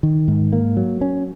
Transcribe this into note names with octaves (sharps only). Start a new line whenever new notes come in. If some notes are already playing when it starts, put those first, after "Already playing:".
D#3
G#2
A#3
F#3
C#4